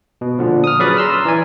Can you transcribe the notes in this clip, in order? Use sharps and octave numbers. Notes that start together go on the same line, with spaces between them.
B2
A#2 D3 F3
D#6 F6
F#3 C#4 G#4 B4 D5 B6
A#5 C6 E6 F6
E3 D5 G#5